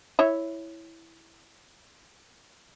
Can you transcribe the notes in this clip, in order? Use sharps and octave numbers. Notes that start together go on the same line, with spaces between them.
E4 C#5 E5